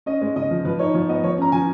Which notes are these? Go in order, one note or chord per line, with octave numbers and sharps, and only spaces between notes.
C#4 D#5
G#3
C#3 D#5
F3
F3 B4
D#4 C#5
F3 C#5
B3 D#5
F3 C#5
C#4 A#5
F3 G#5